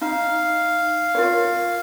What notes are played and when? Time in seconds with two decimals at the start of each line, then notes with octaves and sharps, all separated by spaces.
0.01 D#4 F5
1.15 F4 A#4 C#5